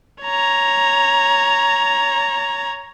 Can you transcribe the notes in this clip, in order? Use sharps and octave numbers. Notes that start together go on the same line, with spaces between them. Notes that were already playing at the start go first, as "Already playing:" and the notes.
C#5 A#5